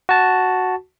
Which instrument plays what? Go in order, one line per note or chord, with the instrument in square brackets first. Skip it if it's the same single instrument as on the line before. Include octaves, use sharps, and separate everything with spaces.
[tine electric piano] F#4 A5